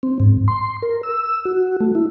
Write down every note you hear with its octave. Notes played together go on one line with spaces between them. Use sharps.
C4
G#2
C6
A#4
E6
F#4
A3
E4